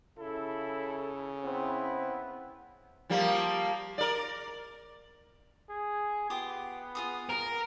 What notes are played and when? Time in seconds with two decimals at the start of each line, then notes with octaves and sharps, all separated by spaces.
0.18 C#3 E4 A4
1.44 B3 C4 E4
3.09 F3 G3 A#3
3.98 A#4 D5
5.69 G#4
6.30 B3 F4 G4 D#6
6.95 F4 G#4 D#6
7.29 A#4